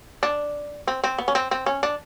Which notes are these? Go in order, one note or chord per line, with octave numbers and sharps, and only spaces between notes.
D4
C4
C4
B3
C#4
C4
C4
C#4
D4